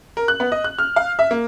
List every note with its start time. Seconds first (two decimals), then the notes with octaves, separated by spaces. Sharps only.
0.17 A#4
0.28 F#6
0.40 B3
0.52 D#5
0.64 F#6
0.78 F6
0.96 F5
1.19 E5
1.31 A#3